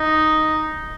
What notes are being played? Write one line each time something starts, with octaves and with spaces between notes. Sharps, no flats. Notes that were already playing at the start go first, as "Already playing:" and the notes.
Already playing: D#4